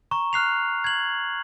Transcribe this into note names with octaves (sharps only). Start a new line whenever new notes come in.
A#5 C#6
F6 F#6 C7 F7
G#6 F#7